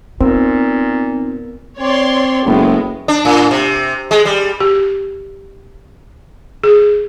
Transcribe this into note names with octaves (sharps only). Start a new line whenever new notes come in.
A#2 B3 C4 D#4 A#4
C4 C#5 D5 C6
F#1 A2 G#3 B3
D4
A2
C3
G#3
G3
G4
G#4